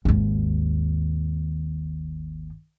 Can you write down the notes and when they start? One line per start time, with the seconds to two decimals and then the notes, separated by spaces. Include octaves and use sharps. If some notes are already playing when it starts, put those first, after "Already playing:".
0.05 G#1 D#2